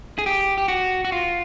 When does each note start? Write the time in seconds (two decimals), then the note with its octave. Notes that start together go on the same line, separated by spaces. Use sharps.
0.19 G#4
0.26 G4
0.58 G4
0.68 F#4
1.05 F#4
1.12 F4